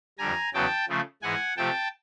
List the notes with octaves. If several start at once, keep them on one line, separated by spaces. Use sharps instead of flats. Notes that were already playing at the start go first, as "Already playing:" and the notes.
F2 D3 G3 G#5 A#5
E2 C#3 F#3 B3 G5 A5
C#3 F3 A3
G#2 E3 G#3 F#5 G#5
C3 F3 A3 G5 A5